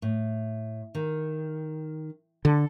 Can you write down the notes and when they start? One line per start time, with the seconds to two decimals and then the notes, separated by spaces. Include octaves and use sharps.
0.02 A2
0.95 D#3
2.45 D3 A4